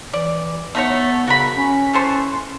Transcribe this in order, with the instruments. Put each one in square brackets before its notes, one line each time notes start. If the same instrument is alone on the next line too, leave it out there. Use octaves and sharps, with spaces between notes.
[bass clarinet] E3 [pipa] D5
[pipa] A3 D#4 C#5 [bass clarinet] B3
[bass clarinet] C#3 [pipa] F#4 A#4 B5
[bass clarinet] C#4
[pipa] E3 A4 C5